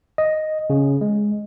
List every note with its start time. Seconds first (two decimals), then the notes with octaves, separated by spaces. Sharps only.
0.18 D#5
0.70 C#3
1.01 G#3